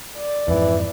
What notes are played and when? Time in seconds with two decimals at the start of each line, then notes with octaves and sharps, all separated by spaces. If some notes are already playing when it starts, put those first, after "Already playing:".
0.17 D5
0.48 F2 G#2 E3